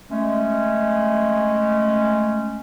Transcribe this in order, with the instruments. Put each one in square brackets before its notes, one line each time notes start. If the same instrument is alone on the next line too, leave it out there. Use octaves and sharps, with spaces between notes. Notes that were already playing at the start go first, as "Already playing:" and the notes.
[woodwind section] G#3 A3 C#4